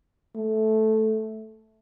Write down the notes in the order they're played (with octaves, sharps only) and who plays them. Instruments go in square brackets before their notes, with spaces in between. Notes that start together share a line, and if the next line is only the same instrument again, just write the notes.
[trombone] A3